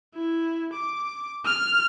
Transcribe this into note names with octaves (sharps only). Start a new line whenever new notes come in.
E4
D6
F6